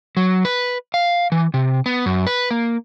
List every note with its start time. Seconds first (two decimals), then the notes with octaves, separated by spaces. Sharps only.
0.17 F#3
0.45 B4
0.94 F5
1.32 E3
1.54 C3
1.86 B3
2.06 F#2
2.27 B4
2.50 A#3